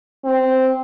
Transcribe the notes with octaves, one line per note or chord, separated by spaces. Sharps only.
C4